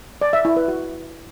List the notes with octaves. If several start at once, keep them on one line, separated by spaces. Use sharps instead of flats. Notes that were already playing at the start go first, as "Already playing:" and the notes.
D5
E5
E4
B4
F#4